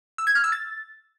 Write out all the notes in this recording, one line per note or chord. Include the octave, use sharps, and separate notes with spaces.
E6
G#6
F6
E6
A6